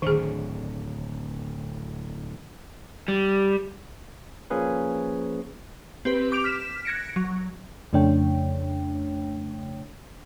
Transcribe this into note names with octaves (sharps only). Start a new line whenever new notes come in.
D1 D3 D#3 G#4
G3
F3 A#3 C#4 G#4 B4
C4 G4 B4
D6 G6 D7 F7
F6 B6 E7
F#6 G#6 A#6 C#7 D7
F#3
F2 C#3 A3 D4 C#5 G5